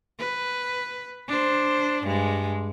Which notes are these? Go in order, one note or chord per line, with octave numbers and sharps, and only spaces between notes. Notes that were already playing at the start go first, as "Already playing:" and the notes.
B4
D4 C5
G2 G#3